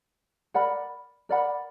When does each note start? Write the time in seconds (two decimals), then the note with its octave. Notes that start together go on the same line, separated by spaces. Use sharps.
0.54 A#4 D5 F#5 B5
1.29 A#4 D5 F#5 B5